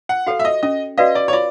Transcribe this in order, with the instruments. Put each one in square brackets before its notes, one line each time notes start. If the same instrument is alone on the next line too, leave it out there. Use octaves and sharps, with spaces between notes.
[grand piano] F#5
[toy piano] F#4 A4 C#5 [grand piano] F5
[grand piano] E5
D#5
[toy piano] C#4 [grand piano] D#5
[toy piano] F#4 B4 D5 F5 [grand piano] D#5
[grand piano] D5
C#5
[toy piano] F4 [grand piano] D5